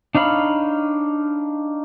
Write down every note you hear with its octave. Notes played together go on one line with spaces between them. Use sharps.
D4 D#4 C#5 F5 B5